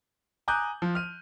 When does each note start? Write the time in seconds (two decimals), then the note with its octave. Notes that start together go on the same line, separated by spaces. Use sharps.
0.48 G#5 A#5 D6 D#6 F#6 G6
0.82 F3
0.95 F6 D#7